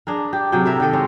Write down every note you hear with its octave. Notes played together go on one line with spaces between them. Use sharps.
D4 G#4 A#4
G4
C3 F#3 G#4 G5
E4 A4 A#4 E5
D#3 G4 A4 D#5
G#3 C4 C#4